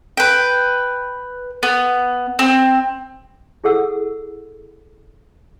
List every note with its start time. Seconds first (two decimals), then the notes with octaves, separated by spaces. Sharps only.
0.17 B4 G5
1.63 B3
2.39 C4
3.64 E4 G#4 A4 F#5 E6